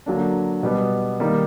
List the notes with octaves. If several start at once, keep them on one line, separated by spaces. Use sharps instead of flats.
D3 F#3 A#3 D4
B2 G3 B3
D#3 G3 A#3